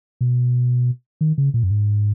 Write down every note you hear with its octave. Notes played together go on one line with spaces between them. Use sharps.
B2
D#3
C#3
A#2
F#2
G#2